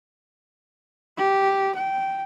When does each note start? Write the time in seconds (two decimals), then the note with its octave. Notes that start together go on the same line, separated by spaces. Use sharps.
1.17 G4
1.75 G5